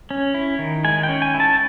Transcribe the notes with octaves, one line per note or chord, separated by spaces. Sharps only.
C#4
E4
D#3
G#3 G#5
G5
C#4
G#5
E4
A5